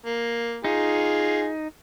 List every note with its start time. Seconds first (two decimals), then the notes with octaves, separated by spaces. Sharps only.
0.06 A#3
0.64 D#4 F4 G#4